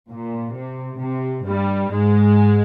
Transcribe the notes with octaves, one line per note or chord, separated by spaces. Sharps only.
A#2
C3
C3
G2 G3
G#2 G#3